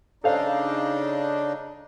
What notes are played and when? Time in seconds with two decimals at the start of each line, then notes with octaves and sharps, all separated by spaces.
0.24 C#3 D4 D#4 A4 C5 F5